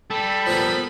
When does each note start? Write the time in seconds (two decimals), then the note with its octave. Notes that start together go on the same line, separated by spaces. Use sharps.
0.10 G3 A4 B5
0.46 F3 A#3 B3 B5